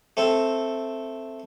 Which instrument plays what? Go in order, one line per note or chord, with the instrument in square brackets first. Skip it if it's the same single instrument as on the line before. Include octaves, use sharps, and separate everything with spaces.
[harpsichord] A3 C4 A4